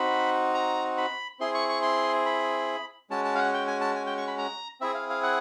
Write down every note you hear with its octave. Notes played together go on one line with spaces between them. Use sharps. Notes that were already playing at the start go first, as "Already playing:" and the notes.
Already playing: C4 D#4 F#4 B5
A#5
B5
C4 E4 G#4 C6
C#6
C#6
C6
B5
G#3 C#4 F#4 A5
A5
F5
F#5
G5
G#5
A5
G#5
G5
C#6
B5
A#5
C4 E4 G#4 E5
F5
F5
F#5